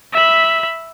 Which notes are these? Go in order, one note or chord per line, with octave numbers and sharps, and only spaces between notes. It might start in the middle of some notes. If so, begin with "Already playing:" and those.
E5 B5